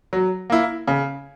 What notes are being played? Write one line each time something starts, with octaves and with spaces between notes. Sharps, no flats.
F#3
A#3 E4
C#3